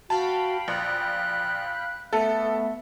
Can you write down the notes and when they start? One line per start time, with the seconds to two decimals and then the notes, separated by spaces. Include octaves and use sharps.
0.10 F#4 F5 G5 A5 B5
0.68 A#1 F#6
2.13 A3 B3 A4 E5